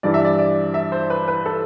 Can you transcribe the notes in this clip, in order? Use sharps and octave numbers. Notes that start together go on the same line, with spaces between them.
G2 E3 G3 D5
E5
D5
D5
E5
C5
B4
B4
A4